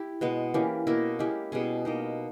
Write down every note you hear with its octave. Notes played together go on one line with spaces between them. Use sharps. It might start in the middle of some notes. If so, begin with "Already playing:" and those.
Already playing: E4 G4
B2 G#3 B3
E3 A#3 C#4 G4
B2 A#3 E4 A#4
G#3 C#4 E4 G4
B2 G3 C#4 G#4
B2 A#3 D#4